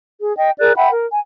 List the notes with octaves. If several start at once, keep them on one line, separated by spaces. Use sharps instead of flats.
G#4
D#5 G5
G#4 A#4 D5 F#6
E5 F#5 G5 B5
A#4
G#5